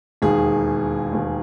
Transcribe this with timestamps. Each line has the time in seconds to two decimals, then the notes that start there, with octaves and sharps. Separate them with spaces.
0.22 E1 D#2 D#3 G#4
1.13 E1 D#2 D#3